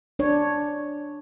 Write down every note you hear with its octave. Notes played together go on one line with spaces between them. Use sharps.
D4 C#5